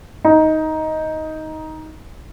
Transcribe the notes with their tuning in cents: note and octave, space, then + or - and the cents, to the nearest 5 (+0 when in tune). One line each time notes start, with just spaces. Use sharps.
D#4 +10